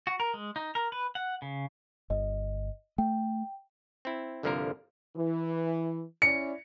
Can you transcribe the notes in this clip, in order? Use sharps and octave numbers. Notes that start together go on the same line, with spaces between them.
F#4
A#4
G#3
D#4
A#4
B4
F#5
C#3
G1 D#5
A3 G5
C4 E4
G1 C2 D3 F3 A#3 A#4
E3
C#4 E4 D5 C#7